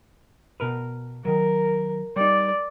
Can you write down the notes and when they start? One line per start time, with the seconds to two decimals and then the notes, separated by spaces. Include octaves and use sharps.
0.60 B2 A#4 B4
1.25 D#3 F#3 A#4
2.16 G3 D#4 D5